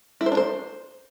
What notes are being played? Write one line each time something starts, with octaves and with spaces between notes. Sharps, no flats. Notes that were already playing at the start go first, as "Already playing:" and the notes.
E4
C5
D4
C5